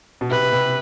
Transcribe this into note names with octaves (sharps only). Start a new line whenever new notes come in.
B2
C3 B4
C3